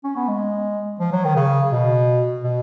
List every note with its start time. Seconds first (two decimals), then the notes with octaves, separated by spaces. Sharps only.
0.04 C#4
0.16 B3
0.28 G#3
1.00 F3
1.12 F#3
1.24 D#3
1.36 C#3
1.72 B2
2.44 B2